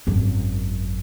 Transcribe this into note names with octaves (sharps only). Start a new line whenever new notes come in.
G#1 F#2